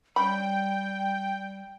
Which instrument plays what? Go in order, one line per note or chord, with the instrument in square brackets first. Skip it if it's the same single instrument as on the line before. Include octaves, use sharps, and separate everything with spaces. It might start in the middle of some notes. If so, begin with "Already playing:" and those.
[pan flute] G3 [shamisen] C#4 B5 [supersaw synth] G5